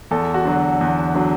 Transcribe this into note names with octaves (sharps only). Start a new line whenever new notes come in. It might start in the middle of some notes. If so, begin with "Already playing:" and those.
E2 A4
F#4
D3 F#3
E2
D3 F#3